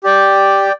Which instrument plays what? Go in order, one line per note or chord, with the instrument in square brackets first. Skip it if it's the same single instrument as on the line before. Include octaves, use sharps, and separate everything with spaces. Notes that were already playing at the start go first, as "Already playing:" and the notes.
[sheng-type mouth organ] G4 D5 G5